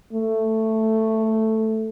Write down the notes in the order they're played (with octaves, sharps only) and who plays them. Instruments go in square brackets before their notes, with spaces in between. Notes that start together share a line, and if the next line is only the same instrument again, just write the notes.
[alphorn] A3